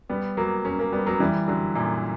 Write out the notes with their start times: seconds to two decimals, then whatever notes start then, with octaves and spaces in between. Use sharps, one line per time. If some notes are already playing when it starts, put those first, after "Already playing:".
0.09 G3 B3
0.37 F#3 A#3
0.65 A#3 C#4
0.79 A#3 C#4
0.93 G3 B3
1.06 F#3 A#3
1.20 E3 G3
1.48 D3 F#3
1.75 F#2 A#2